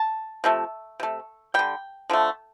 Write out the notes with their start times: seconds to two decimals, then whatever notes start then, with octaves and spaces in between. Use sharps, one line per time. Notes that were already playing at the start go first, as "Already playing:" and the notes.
Already playing: A5
0.44 C3 F3 A3
1.00 C3 A3
1.54 D3 G3 G5
2.10 D3 F3 A3